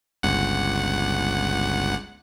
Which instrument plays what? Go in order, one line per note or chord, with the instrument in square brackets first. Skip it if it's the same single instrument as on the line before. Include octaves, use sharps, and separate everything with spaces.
[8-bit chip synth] G1 C#2 F#5